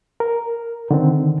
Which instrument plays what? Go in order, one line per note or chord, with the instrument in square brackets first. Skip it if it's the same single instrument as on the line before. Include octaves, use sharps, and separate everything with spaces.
[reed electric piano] A#4
D3 D#3 C4